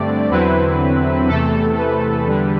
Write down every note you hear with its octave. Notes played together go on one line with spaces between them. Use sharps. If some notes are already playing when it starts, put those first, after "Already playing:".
Already playing: G2 D3 A3 C4 D5
E2 D3 F#3 C4 E4 B4
E2 C3 E3 A3 A4
B4
E2 D3 G3